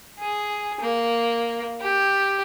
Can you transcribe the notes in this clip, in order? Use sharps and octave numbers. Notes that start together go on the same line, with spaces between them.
G#4
A#3
G4